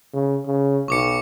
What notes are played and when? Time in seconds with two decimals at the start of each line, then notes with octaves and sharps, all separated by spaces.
0.13 C#3
0.46 C#3
0.88 B1 C#6 D6 C#7